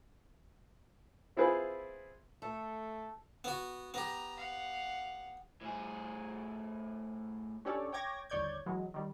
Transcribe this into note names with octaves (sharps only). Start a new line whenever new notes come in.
C4 E4 F4 G#4 B4 C5
A3 A4
B3 F#4
B3 G4 A#5
F5 F#5
A2 G#4
C#4 D4 G4 A4 C#5 D5
C#5 G5 D6 G#6 A#6
G1 D#2 C#5 D5 G6 G#6
E3 F#3 G#3
D#3 G3